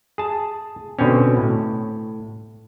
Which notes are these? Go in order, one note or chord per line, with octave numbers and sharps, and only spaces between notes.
G#4 A5
B2 D3 C4 C#4
A2